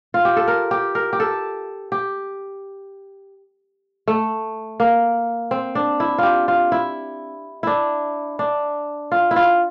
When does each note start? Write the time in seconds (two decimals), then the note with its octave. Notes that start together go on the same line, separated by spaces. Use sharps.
0.14 F4
0.25 G4
0.36 A4
0.48 A#4
0.71 G4
0.95 A#4
1.13 G4
1.20 A4
1.92 G4
4.08 A3
4.80 A#3
5.51 C4
5.75 D4
6.00 E4
6.18 F4 G4
6.48 F4
6.72 E4
7.63 D4 E4
8.39 D4
9.12 F4
9.31 E4
9.36 F4